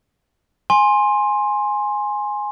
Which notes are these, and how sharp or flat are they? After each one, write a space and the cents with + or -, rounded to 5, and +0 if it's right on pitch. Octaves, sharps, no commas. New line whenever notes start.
G#5 +0 C6 +15